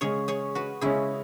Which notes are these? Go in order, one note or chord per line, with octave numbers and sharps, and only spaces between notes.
C#3 G#3 C#4 G#4 C#5
G#4 C#5
F#4 B4
C#3 G#3 C#4 E4 G#4